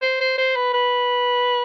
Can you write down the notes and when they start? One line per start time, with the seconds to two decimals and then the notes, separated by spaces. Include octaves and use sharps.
0.02 C5
0.21 C5
0.38 C5
0.56 B4
0.74 B4